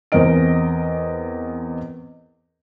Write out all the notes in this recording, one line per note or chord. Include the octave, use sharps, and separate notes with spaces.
E2 C4 A#4 D#5 D7